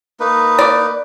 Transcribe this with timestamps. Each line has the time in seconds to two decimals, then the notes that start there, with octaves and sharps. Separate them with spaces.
0.20 A#3 D#4 B4
0.59 D5